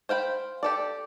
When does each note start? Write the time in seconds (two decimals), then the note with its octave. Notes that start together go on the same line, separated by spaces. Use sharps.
0.09 C5 F5 G5 B5
0.63 G4 A4 D5